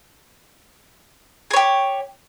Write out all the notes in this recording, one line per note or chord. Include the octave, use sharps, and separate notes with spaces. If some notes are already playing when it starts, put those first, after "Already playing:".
G4 G#4 C#5